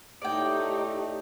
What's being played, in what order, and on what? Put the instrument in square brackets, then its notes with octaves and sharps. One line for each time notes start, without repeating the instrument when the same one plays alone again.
[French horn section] A2 A3 [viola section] D#4 G4 [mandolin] D5 G5